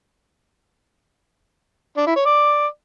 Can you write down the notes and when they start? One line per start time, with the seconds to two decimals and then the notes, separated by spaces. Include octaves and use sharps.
1.97 D4
2.07 E4
2.16 C#5
2.25 D5